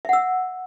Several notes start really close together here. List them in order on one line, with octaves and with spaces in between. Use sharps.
E5 F#5 E6